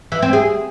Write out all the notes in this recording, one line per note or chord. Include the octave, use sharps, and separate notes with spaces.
E3
C4
G#4